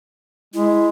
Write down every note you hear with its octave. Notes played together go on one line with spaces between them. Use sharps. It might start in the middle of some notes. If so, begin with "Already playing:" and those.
G#3 E4